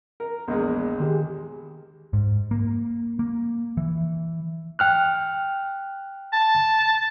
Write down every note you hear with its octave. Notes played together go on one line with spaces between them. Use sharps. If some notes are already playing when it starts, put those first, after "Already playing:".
A#4
A#1 E2 G#3
D#3 G4 G#4
G#2
A#3
A#3
E3
G5 F6 F#6
A5